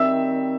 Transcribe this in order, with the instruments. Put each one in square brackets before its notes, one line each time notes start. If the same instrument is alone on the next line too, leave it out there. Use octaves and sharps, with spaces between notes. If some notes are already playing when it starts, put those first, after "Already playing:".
Already playing: [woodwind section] D#3 G3 C4 [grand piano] E5 E6